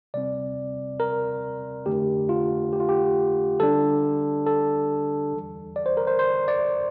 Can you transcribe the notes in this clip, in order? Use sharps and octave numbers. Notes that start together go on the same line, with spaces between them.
C3 G3 C4 D5
A#4
F2 D3 A3 D4 G4
F4
G4
F4
G4
D3 G3 D4 A4
A4
E2 E3 G3
D5
C5
A#4
C5
C5
D5